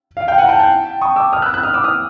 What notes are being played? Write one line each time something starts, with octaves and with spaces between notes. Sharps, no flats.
F5
F5 G5
F#5 G#5
A#5
G5 A5
G5 A5
C#6 D#6
D6 E6
D#6 F6
E6 F#6
E6 F#6
D#6 F6
D6 E6
D#6 F6